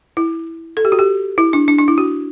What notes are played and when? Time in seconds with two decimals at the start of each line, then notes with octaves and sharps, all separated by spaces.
0.17 E4
0.77 A4
0.85 G4
0.92 F#4
0.99 G4
1.38 E4
1.53 D4
1.68 D4
1.78 D4
1.88 E4
1.98 F#4